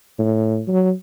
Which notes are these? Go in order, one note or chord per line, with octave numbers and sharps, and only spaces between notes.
A2
F#3